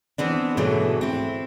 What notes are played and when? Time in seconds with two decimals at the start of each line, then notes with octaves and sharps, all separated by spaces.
0.18 E3 B3 C4 D4
0.57 G#2 B2 D3 E3 F#3 A3
1.01 C4 E4